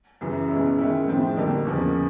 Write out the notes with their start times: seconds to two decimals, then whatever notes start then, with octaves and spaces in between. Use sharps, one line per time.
0.21 F#2 C#3 E3
0.50 B2 G#3 C#4 E4
0.79 D#3 G#3 C#4 E4
1.07 A2 F3 G#3 C4 E4
1.37 F2 D3 G3 A#3 D#4
1.65 E2 C#3 F3 A#3